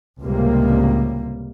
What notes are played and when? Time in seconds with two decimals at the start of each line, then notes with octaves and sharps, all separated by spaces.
0.21 C#2 A2 C3 G3 A#3